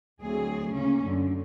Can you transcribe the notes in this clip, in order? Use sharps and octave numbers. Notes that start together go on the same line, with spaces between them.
D2 F#3 C4 G#4
C#3 A#3 C#4
F#2 D3